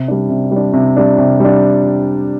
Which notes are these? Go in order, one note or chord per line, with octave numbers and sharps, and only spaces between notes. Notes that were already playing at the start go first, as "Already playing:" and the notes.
Already playing: C3
G3 D4
C3
G3 D4
C3
G3 D4
C3
G3 D4